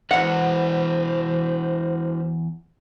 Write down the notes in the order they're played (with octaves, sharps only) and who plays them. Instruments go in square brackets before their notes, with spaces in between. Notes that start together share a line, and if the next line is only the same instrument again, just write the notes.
[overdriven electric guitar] E2 [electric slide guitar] E4 F#4 B4 [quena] C5 [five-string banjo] F#5